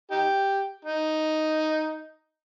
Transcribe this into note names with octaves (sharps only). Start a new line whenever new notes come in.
D#4 G4
D#4